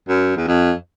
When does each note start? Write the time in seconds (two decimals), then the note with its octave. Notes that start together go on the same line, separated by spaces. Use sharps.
0.09 F#2
0.37 E2
0.47 F2